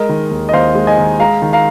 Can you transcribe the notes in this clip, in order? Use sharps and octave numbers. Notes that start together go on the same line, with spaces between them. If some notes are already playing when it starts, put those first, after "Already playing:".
Already playing: G#3 A#4 D#5
D#3
D#2
D#5
D#2 C5 F5
G#3
D#5 G#5
D#3
G#3 F5 A#5
D#3
F5 A#5